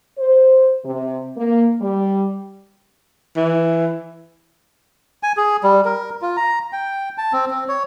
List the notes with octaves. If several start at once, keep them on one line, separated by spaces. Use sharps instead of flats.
C5
C3
A#3
G3
E3
G#5
G#4
G3
A#4
F4
A#5
G5
A5
C4
C4
C#5